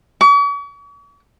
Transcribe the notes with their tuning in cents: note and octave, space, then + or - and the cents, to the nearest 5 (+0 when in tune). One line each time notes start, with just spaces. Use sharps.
C#6 +45